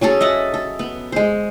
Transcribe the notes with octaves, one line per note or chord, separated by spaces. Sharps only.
F#3 C#4 G#4 A4
D#5 E5 F#5 A5
A4
B3
G#3 C5